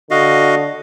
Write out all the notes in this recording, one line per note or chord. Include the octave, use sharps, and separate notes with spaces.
D3 F#4 D#5 F5